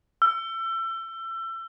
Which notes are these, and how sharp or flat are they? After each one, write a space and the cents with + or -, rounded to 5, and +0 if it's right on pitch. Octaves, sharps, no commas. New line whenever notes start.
E6 +30